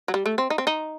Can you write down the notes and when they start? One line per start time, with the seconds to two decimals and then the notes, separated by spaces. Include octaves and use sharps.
0.08 F#3
0.14 G3
0.26 A3
0.38 C4
0.50 D#4
0.58 C4
0.67 D#4